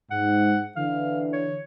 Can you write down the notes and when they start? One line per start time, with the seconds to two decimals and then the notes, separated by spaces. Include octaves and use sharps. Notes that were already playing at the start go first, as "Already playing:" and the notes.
0.11 G#2 F#5
0.76 D3 E3 F5
1.33 C#5